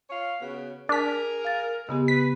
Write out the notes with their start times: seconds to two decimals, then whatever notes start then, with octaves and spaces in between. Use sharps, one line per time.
0.10 F4 C#5 F5
0.41 C#3 B3 F#4
0.89 D4 G#4 A#4 B6
1.45 F5 A6
1.89 C#3 G#3 B3 G4
2.08 B4 B6